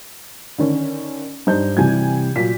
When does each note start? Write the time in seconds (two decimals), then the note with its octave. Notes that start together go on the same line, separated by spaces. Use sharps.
0.58 D3 D#3 C#4
1.47 G2 D#4 C5 G6
1.77 C3 E3 G3 G#5 G#6
2.36 A#2 F#3 B6